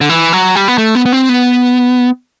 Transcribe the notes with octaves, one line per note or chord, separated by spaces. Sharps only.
D3
E3
F#3
G3
B3
A3
B3
B3
C4
B3